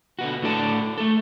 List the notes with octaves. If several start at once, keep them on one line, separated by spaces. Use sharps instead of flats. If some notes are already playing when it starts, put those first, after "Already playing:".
D3 B3 F#4
A2 A3 D4 A4 D5 A5
A3 A4